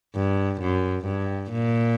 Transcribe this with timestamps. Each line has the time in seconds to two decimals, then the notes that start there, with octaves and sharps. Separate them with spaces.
0.15 G2
0.61 F#2
1.06 G2
1.52 A#2